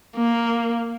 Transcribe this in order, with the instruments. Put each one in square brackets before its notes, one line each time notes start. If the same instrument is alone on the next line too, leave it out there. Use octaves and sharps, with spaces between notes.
[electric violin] A#3